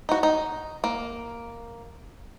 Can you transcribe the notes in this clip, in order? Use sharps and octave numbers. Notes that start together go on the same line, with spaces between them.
D#4 F#4
D#4
A#3